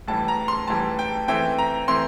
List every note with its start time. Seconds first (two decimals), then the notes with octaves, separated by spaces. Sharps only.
0.08 A2 E3 G3 A5
0.28 A#5
0.48 C6
0.68 A2 E3 G3 A5
0.99 G5
1.28 E3 A3 C4 G5
1.58 A#5
1.88 E3 A3 C4 C6